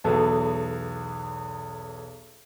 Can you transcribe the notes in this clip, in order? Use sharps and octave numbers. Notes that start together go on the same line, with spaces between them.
B1 E2 F#3 B3 A4